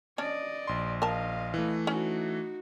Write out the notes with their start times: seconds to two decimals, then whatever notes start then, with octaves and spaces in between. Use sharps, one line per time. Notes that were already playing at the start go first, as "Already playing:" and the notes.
0.18 C#4 D4 D5 D#5
0.67 A#1 C6
1.02 A#4 D#5 F5 A5
1.54 E3 A3
1.87 C#4 D#4 F#4